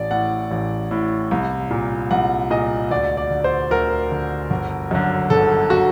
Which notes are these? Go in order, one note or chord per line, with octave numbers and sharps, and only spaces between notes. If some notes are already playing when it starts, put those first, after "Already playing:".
Already playing: A1 D5
A2 F#5
A1
A2
C2
A#2
C2 F#5
A#2 D#5
D2 D5
D5
D3
C5
D2 A#4
D3
G1
F#2 D3
G1 A4
D3 F#4